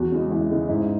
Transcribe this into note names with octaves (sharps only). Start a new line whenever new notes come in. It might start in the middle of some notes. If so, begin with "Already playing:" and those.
Already playing: E2 F#4
C#3 G#3
E2 E4
C#3 G#3
G#2 E4